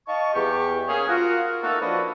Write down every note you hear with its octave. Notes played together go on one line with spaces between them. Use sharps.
D#5 F5 A5 C#6
E2 G4 C#6
A#3 C#4 G#4
F4 F#4 A#4
A3 A#3 D#4 F#4 A4
F3 D4 F#4 B4 C#5 D#5